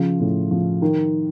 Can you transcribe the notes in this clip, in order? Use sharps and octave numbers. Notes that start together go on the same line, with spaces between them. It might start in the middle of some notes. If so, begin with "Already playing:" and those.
Already playing: C#3 F3
A2
F3
D#3